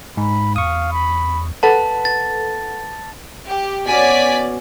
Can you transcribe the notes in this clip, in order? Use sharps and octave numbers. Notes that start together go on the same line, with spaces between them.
G#2 B5
E2 F5 C#6 D#6
B5
A4 B4 F#5 A5
A6
G4
B2 C#4 D5 G#5 B6